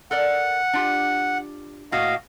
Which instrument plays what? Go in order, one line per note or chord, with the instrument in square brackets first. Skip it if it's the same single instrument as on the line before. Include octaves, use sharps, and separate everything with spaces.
[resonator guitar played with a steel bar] A4 A#4 D5 [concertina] F#5
[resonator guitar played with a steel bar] D4 F4 G4
[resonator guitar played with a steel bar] A2 A#3 F#4 [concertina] D#5 F5